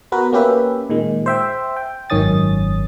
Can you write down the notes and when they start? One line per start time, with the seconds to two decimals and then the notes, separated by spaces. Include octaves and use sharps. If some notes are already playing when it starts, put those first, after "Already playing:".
0.12 B3 F#4 A#4 B4
0.33 A#3 C#4 G4 B4 E5
0.90 A#2 D#3 G#3
1.26 C5 E5 G5
1.76 G5
2.10 G#1 F#2 D#3 C#4 D#6 A6